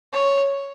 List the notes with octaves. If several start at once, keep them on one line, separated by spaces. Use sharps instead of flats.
C#5